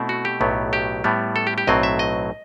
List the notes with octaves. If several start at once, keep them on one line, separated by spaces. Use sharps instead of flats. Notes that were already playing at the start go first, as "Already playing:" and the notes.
Already playing: B2 A3 C4 E4
F#4
G4
B1 A2 F#3 B3
G4
A2 G3 B3
A4
G4
G4
B1 A2 F#3 C4 D#5
E5
D#5